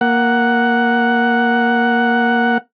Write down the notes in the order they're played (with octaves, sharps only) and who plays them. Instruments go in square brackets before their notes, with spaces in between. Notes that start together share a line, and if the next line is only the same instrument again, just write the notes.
[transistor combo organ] A#3 F#5